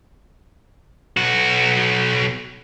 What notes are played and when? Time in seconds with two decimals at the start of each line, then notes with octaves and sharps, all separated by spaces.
1.17 B1 F#4